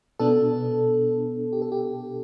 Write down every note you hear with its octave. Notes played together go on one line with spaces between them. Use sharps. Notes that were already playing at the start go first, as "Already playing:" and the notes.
B2 B3 D4 A4
G4
A4
G4